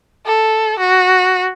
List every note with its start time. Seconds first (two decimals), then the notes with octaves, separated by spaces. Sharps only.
0.26 A4
0.79 F#4